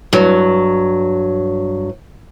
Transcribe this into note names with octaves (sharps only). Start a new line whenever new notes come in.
G2 F#3